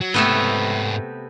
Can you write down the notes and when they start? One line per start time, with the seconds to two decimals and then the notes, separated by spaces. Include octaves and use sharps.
0.01 F#3
0.14 G#2 C3 A3 B3 E5